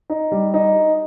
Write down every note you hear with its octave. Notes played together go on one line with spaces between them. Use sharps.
D#4
G3
D#4